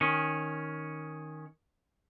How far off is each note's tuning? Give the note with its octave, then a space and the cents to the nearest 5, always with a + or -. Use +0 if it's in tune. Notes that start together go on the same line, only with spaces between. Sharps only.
D#3 +0 C#4 +0